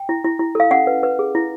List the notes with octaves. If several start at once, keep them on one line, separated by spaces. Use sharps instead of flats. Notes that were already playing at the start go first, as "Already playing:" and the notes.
Already playing: G5
E4
E4
E4
A4 F5
C#4 F#5
B4
B4
G#4
E4